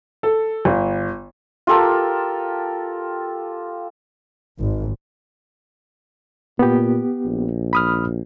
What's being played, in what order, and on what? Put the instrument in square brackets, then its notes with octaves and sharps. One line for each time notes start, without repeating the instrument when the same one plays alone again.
[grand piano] A4
G1
[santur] F4 G4 A4 A#4
[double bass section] G#1
[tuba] A#2 [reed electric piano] B3 G4
[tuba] A#1
[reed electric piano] B5 D#6 F6